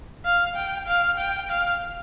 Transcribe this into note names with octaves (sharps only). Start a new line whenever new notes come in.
F5
G5
F5
G5
F5